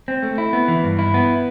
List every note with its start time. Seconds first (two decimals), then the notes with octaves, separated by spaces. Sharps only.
0.08 C4
0.22 A3
0.38 E4
0.53 B3
0.68 E3
0.84 G2
0.99 E4
1.14 B3